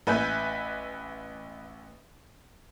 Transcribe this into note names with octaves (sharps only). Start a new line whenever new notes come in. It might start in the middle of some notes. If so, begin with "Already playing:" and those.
A1 B4 E5 G#5 G6